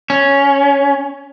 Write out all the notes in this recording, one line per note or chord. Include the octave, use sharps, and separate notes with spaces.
C#4